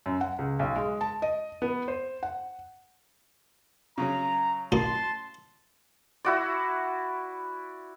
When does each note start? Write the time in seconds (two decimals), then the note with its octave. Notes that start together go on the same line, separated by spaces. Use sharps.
0.06 F#2
0.21 F#5
0.39 C#2
0.59 B1
0.76 G#3
1.01 A5
1.22 D#5
1.62 B3
1.88 C5
2.23 F#5
3.98 C#3 F#3 C#4 A#5
4.72 A1 B2 A#3 A5 C6
6.25 E4 F#4 D5